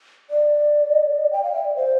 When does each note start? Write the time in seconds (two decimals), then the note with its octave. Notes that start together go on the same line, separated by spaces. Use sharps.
0.30 D5
1.33 G5
1.43 F5
1.54 E5
1.65 D5
1.76 C5